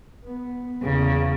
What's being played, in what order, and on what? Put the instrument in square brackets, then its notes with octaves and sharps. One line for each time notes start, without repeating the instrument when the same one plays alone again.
[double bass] B3
[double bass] E2 [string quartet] C#3